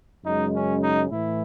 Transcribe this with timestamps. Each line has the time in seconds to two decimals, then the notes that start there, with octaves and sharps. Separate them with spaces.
0.23 F#2 C#3 G#3 D#4
0.53 C#4
0.82 D#4
1.11 A2 E3 E4